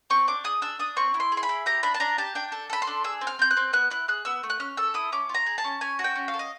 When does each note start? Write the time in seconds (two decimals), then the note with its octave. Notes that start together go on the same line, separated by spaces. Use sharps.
0.10 C4 C#6
0.28 D4 D6
0.44 G#4 D#6
0.62 D4 E6
0.79 D4 D#6
0.97 C4 C#6
1.14 E4
1.20 C6
1.32 G#4
1.37 C6
1.43 B5
1.49 E4
1.66 G4 A#5
1.83 D4 B5
1.94 A5
2.00 D4 A#5
2.18 G4 A5
2.35 D4 G5
2.52 A4
2.70 A4 B5
2.82 C6
2.87 D4
3.04 G#4 E6
3.21 C4
3.27 F6
3.39 C4 G6
3.51 F#6
3.57 C4
3.73 B3 F#6
3.91 E4 F#6
4.08 G#4 F#6
4.25 B3 E6
4.43 A3
4.50 F#6
4.60 C#4 F6
4.77 A4 E6
4.94 E4 D#6
5.12 C#4 D6
5.29 F4
5.35 A#5
5.46 G#4
5.58 A5
5.64 C#4
5.81 C#4 G#5
5.99 F#4
6.04 G5
6.16 C#4
6.28 F5
6.34 A4
6.39 D#5